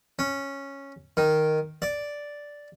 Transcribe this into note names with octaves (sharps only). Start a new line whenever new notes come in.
C#4
D#3
D5